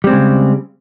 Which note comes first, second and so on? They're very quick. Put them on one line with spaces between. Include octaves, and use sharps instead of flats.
G3 C4 G#3 C#3